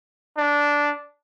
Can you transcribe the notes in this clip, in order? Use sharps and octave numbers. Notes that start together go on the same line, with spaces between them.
D4